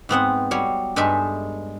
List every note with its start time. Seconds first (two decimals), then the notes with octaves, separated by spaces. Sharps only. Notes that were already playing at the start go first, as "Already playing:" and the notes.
0.09 G#2 B3 C4 F#5
0.51 F#3 G3 C#5
0.96 G2 G#3 D#4 A4 E5